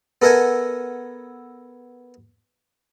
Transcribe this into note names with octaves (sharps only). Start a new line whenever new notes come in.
B3 A4 A#4 E5 F#5 G#5